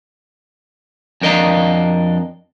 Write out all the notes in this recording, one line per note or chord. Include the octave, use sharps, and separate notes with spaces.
F2 D4 A#4 D#5 F5 A#5